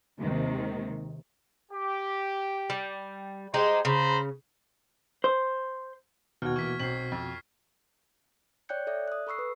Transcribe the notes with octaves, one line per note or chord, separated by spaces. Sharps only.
D#2 C3 D#3 G#3
G4
G3
G#3 D#4 G4 C5
C#3 C5 A#5 B5
C5
D#2 B2 F#4 F6 G#6
E3 A#3 C#6 B6
B1 C4 B6 C7 F#7
F2
C#5 D5 G5 F#6 G6 C#7
A4 D5 E5
D#6 F#6
A4 B5 C#6 E6 C7
B4